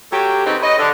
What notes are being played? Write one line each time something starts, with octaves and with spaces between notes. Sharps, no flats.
F#3 A3 G4
C#3 B3 C4 D#4
B4 C#5 D#5
D3